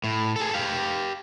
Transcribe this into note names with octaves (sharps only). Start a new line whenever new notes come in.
A2
G#4 A4
G4 F5